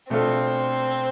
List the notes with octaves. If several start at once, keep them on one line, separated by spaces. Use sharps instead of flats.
B2 A3 C4 D4 F4 A4